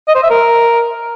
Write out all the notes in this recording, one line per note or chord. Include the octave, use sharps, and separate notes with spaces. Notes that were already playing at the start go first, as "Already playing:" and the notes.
D#5
C5
E5
A#4